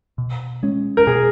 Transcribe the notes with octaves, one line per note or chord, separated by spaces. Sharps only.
B2
G#3 C#4
A#4
B2 G#4